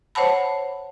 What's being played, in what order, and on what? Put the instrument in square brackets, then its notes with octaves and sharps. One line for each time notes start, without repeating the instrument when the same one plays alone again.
[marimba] C5 C#5 F#5 A5 B5